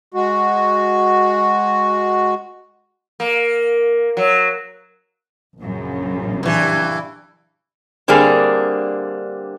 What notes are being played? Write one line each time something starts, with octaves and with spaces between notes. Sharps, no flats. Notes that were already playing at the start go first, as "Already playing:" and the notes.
G#3 F#4
A#3
F#3
A#1 F#2 C#3
G2 E3
D3 G3 A#3 C4 D4 G#4